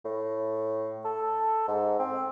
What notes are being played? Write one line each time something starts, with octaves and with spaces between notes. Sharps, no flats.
A2
A4
G#2
C4